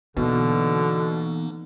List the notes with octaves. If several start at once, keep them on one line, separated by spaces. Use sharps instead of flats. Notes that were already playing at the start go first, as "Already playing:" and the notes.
B2 D3 E3 A#3 B3 D#4